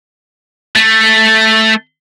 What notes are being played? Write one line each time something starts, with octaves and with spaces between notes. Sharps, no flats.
A3